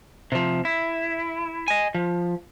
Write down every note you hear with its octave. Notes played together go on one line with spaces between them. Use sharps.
C3 F3
E4
D#5 G#5
F3